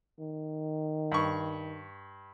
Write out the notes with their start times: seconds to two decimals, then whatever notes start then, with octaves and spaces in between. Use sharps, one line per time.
0.20 D#3
1.12 G2 C#6